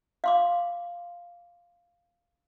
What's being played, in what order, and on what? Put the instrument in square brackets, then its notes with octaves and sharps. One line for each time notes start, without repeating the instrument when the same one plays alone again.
[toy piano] F5 C6 D6